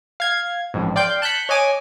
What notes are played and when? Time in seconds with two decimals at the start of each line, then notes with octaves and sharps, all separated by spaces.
0.20 F5 G#6
0.74 A1 F2 G#2
0.96 D5 F5 G5 C6 G6
1.22 A5 F#6 G6 B6 C#7
1.49 C#5 D#5 G#5 D6